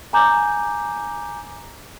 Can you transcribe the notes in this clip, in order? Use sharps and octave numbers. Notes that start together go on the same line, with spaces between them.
G#5 A#5 D6 G6